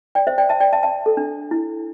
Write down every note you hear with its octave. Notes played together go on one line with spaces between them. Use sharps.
D5 G5
C5 E5
D5 G5
E5 A5
D5 G5
E5 A5
E5 A5
A4
D4
E4